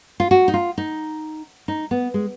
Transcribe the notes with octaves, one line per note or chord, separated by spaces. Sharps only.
F4
F#4
D#4
F4
D#4
D#4
B3
G#3